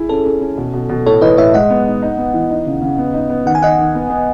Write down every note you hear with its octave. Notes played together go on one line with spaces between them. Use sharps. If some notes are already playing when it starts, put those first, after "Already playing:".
Already playing: E4 G#4
C#4 A4
C#4
C#4
B2
B2
B2
A2 A4 C#5
E3 B4 D#5
A2 C#5 E5
G#3 D#5 F#5
B3
D#4
D#4
B3
E3
D#4
C#3
C#3
B3
D#4
B3
D#3 F#5
G#5
D#3 D#5 F#5
D#3
B3
B3